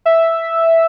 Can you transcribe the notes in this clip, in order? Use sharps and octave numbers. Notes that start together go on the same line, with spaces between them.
E5